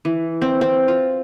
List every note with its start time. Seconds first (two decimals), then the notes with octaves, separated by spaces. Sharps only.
0.05 E3
0.42 C4
0.61 C4
0.88 F4